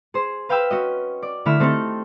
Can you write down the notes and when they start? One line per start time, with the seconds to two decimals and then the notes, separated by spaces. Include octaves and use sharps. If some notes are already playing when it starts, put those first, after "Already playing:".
0.14 G#4 C5
0.49 B4 F5 G5 B5 E6
0.70 C#4 F#4 D#5
1.22 D5
1.45 D3 A3 E4 B5 F6 E7
1.60 A3 C4 D#4 G4 A4